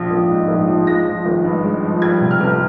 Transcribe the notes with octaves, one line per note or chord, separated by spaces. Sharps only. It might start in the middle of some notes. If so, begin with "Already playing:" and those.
Already playing: A#1 F3
A#1
G#2
A#1
F3
G#3 A#6
F3
G#1
G2
G#3
F3
G3 G#6
C3
F6
G1